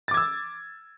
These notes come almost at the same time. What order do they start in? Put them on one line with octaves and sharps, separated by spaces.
A6 D6 G#6 E6